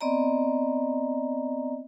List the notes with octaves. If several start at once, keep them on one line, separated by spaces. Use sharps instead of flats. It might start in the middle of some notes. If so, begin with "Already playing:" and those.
B3 C4 D5 D#5 A#5